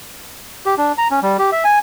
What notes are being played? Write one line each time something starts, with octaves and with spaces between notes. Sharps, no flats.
G4
D4
A#5
C#4
G3
G4
E5
G#5